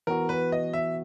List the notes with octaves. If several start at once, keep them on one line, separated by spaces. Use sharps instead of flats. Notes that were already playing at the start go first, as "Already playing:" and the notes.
E3 B3 F#4 A#4
B4
D#5
E5